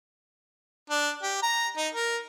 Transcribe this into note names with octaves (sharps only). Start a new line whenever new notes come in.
D4
G4
A#5
D#4
A#4